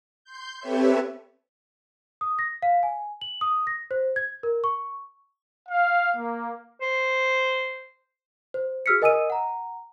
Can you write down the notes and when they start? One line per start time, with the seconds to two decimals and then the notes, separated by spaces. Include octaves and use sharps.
0.24 C6 G6
0.60 C4 G4 A4 B4 C#5 E5
2.21 D#6
2.39 A#6
2.62 F5
2.83 G#5
3.21 F#7
3.41 D#6
3.67 A#6
3.91 C5
4.16 G#6
4.43 A#4
4.64 C#6
5.69 F5
6.16 A#3
6.81 C5
8.54 C5
8.86 F#4 G#4 E6 F6 B6 C#7
9.02 A#4 D#5 G#5 D#6 E6 D#7
9.30 F#5 A#5